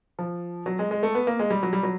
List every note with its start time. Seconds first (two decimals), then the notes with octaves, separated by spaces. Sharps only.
0.19 F3
0.66 F#3
0.79 G#3
0.91 G#3
1.03 A3
1.15 B3
1.27 A#3
1.39 G#3
1.50 G3
1.63 F#3
1.73 G3
1.83 F#3